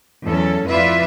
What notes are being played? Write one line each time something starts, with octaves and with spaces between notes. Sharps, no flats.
E2 F#3 C#4 A4
F2 E4 F4 B4 D5 E5